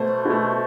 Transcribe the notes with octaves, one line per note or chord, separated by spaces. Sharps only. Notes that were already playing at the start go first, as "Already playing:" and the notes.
Already playing: B2 A3 C5
B2 A3